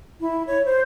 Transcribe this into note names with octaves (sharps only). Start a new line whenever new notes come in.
E4
C#5
C5